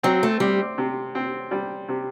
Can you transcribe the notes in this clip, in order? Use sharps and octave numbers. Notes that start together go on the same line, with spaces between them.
F#3 C4
A3
G3 C4
C3
C4
G3
C3